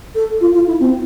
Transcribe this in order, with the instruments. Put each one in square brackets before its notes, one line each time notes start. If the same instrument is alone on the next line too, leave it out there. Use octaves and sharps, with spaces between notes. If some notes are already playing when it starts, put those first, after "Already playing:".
[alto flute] A4
F4
F4
E4
C4